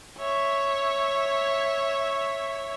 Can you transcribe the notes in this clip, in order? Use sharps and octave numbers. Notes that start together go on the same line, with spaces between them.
C#5 E5